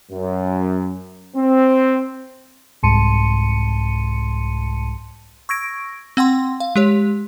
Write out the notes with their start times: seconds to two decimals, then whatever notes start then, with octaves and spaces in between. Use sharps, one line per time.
0.12 F#2
1.36 C4
2.83 C2 G#2 A5 C6 C#7 D#7
5.49 C#6 E6 G#6 A#6 D7
6.17 C4 F#5 G5 C6
6.60 F5
6.76 G#3 G4 C#5